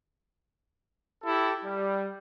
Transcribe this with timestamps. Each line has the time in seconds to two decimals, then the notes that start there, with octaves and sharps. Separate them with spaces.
1.24 E4 G4 A4
1.63 G3